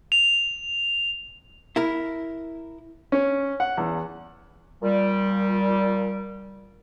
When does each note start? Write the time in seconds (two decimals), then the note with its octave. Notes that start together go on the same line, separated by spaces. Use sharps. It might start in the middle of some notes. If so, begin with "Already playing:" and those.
0.12 F7
1.76 E4 A#4
3.12 C#4
3.60 F#5
3.77 E2
4.82 A#2 G3